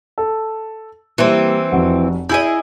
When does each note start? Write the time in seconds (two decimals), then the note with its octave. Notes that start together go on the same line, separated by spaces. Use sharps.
0.18 A4
1.18 E3 G3 A#3 C4
1.72 F1 F#4
2.29 E4 G#4 D#5 G6